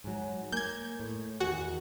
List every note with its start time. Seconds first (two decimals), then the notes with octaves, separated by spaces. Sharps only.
0.04 G#2 F#3
0.52 A#3 G#5 G6 G#6
1.00 A2
1.40 E2 D#3 F#4 G#5